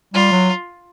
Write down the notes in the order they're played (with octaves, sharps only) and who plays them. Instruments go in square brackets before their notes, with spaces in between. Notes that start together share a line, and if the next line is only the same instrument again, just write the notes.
[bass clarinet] G3 [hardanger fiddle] F4
[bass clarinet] F#3